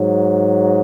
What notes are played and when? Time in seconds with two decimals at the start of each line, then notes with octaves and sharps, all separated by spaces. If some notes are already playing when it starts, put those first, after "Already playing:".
Already playing: G#2 F#3